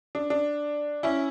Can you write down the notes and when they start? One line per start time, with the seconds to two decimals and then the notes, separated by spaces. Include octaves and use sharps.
0.15 D4
0.30 D4
1.03 C#4 E4